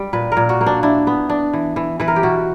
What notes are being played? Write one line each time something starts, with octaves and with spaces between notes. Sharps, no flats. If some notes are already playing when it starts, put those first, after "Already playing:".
Already playing: G3
A#2 B4
A#4
A#2
F#4
A#3
D4
D4 E4
B3
D4
E3
E3
E3 B4
A#4
G4
B2 F#4